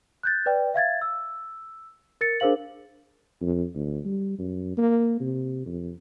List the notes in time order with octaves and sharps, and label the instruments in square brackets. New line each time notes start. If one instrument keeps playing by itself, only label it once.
[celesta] F#6 G6 A6
B4 D5 G5
E5 F5 G#6 A6
E6
A#4 A6 C#7
D4 G#4 A#4 C5 F5 F#7
[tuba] F2
D2
G3
F#2
A#3
C3
F2